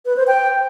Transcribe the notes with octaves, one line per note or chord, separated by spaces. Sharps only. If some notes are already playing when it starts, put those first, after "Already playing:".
B4
C5
G5